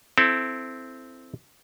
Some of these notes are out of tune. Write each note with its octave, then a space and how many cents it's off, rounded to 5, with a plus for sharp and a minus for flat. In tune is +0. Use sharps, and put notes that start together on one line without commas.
C4 -5 E4 +15 A4 +0